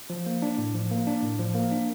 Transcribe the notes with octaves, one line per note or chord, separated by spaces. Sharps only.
F3
A#3
D4
A2
F3
A#3
D4
A2
F3
A#3
D4